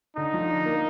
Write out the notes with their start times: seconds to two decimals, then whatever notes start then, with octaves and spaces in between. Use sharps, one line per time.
0.17 D3 D#4
0.34 F3
0.50 D4
0.65 A#3